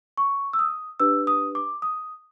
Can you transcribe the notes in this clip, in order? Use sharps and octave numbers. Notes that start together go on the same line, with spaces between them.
C#6
E6
D#6
D4 G4 B4 E6
D#6
D6
D#6